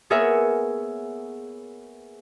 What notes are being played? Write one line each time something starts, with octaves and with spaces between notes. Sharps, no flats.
A#3 B3 G#4 A#4 C#5 E5